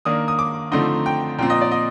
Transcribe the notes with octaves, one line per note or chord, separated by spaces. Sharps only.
D#3 A#3 D4 D#6
D#6
D6
D3 F3 A3 C4 D#4
G5
A#2 F3 C4 G5
D#5
D5
D#5